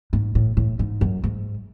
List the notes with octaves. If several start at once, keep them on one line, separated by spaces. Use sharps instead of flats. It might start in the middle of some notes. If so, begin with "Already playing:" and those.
G#2
A2
A2
G#2
F#2
G#2